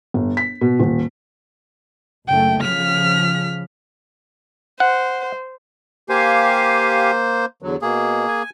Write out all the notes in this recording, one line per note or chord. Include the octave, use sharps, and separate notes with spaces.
G1
B6
B2
D#1
F#1 A3 G5
C#3 F3 F6 B6
C5 F#5
A#3 G4 C5 F5 G#5
E2 D3 F#3
B2 A#3 G#4
G#5